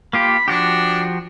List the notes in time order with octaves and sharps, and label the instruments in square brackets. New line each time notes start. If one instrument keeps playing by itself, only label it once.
[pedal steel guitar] A#3 F4 G4 [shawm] B5
[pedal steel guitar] F3 F#4 G4 [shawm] D4